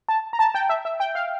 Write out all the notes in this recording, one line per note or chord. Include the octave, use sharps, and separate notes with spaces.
A5
A#5
A5
G5
E5
E5
G5
F5